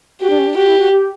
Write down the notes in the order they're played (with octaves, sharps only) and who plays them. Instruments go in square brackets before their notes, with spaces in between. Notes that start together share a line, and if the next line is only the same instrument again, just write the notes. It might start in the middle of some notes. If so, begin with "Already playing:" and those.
[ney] F#4 [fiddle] G4
[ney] D4
C#4
D4
[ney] F#4 [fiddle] G4
[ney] E4
F#4
G4